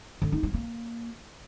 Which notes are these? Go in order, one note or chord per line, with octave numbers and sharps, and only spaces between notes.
D3
D#4
G#3
A#3